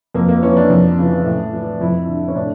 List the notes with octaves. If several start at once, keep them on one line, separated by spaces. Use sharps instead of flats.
F2 A#3
A#3
E3 C#4
D4
F2
C#3 E3
A2
E3
F2 E4
D3
C#4
A2 D4